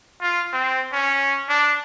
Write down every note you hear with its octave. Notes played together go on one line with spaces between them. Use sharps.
F4
C4
C#4
D4